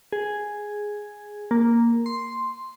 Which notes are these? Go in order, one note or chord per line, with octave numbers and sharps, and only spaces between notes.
G#4
A#3
C6